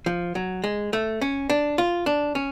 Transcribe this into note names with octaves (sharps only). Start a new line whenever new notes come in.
F3
F#3
G#3
A3
C#4
D4
F4
D4
C#4